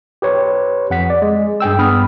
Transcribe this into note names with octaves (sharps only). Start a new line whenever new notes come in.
G4 B4 C#5
F2 F#5 B6
D5
G#3
G2 G#4 G5 E6
G2 B3 B5 D#6 F6